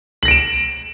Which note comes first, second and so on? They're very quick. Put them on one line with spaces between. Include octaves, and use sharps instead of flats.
F#7 A#6 D7 E7